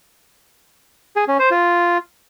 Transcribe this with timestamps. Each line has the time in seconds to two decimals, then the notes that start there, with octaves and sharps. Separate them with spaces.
1.16 G#4
1.28 C#4
1.39 C5
1.51 F4